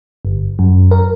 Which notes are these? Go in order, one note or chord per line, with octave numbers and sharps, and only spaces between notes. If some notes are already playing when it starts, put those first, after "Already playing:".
G1
F#2
A#4